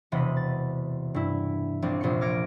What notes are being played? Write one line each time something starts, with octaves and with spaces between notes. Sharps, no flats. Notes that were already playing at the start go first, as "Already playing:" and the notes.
E1 C3 B3 D#5 B5
A6
G2 E4
A#1 C4 D4
F1 A#1 A#2 C5 C6 C#7
D6 F6 G#6 A#6 C#7 D7